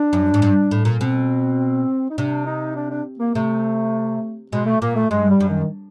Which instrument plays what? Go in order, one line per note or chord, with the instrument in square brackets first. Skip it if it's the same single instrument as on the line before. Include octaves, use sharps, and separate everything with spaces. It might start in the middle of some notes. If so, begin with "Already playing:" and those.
Already playing: [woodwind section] D4
[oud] F#2
G#2
G2
A2
A#2
[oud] B2 [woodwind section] C4
[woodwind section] D#4
[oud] C3 [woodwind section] D4
[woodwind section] D#4
D4
D4
A#3
[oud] C3 [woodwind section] A3
[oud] B2 [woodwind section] G#3
[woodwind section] A3
[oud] A#2 [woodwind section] A#3
[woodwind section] A3
[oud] G2 [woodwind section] G#3
[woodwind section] G3
[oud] F#2
[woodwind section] D#3